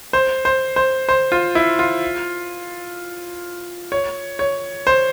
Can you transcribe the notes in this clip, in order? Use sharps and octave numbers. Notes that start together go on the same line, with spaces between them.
C5
C5
C5
C5
F4
E4
F4
C#5
C#5
C5